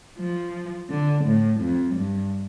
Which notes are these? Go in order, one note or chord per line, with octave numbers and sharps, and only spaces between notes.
F3
D3
A2
F2
G2